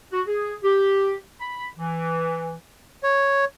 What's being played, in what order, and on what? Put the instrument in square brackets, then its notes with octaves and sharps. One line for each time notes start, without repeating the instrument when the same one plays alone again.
[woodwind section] F#4
G#4
G4
B5
E3
[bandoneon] C#5